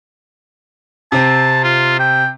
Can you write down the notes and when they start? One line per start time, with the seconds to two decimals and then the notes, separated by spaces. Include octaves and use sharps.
1.12 C3 C4 A5
1.64 F4
1.99 G5